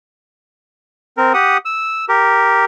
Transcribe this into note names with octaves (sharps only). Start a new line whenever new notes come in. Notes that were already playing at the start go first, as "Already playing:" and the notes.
C4 A#4
G4 F#5 D#6
E6
G4 A#4